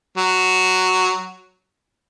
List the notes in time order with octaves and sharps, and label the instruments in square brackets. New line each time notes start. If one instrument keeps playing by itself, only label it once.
[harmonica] F#3